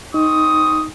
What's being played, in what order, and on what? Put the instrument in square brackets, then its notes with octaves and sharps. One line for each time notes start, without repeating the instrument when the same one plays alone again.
[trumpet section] C4 C#6 D#6 [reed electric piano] D#4